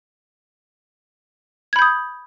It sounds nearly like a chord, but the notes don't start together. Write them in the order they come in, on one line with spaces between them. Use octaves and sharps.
G#6 B5 G6 D#6